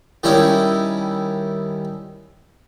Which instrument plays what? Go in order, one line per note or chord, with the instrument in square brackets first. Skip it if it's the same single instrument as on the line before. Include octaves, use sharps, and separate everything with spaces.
[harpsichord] D#3 G3 C#4 E4